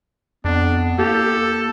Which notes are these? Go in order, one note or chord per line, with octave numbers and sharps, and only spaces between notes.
F2 B3 D4
A#3 G4 A4